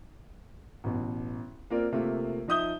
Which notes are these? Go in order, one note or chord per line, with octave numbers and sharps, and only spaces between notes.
A1 B2
A#3 C4 F4 A#4 D5
C3 A3 A#3 F4
F3 D#4 E5 D#6 G6 G7